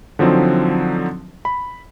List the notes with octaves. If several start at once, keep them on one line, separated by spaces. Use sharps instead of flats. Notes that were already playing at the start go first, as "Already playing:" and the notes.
D3 F3 F#3 C4 D#4
B5